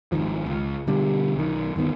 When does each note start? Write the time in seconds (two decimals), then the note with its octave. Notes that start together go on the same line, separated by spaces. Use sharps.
0.12 G#1 D#2 D#3 F3
0.46 C#2
0.87 B2 D3 G3
1.36 B1 D#3
1.76 G1 D#2 D#3 B3